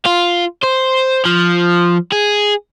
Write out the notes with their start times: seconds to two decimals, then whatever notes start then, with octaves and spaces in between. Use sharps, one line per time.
0.06 F4
0.63 C5
1.25 F3
2.12 G#4